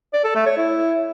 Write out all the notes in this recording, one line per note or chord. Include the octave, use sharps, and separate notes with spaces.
D5
A4
A3
C#5
E4